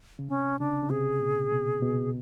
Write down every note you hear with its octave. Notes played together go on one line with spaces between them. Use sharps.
C#3
C3 C#4
C#3 D4
C#3
C3 G#4
A#2
B2
B2